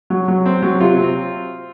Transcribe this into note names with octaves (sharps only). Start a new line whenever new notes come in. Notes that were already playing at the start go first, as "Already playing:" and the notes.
F#3
F#3
C4
F#3
C3 F4
C4